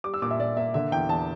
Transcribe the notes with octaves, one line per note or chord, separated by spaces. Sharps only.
G3 D6
E6
A#2 D6
E5
A#2 D5
A#3 E5
D3 E5
E2 G5
E2 A5